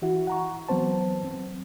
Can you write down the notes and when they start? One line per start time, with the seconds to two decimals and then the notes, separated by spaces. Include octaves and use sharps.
0.02 E3 E4 F#4
0.27 F#5 A#5 C#6
0.68 E3 F#3 B3 C4 C5 A5
1.24 C4